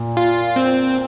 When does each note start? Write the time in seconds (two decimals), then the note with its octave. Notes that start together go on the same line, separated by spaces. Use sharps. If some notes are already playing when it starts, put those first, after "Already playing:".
Already playing: A#2
0.17 F4
0.56 C4